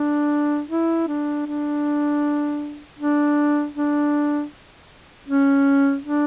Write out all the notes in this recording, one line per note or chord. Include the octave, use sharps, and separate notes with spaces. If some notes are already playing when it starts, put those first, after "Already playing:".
Already playing: D4
E4
D4
D4
D4
D4
C#4
D4